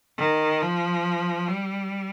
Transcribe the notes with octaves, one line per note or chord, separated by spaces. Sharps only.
D#3
F3
G3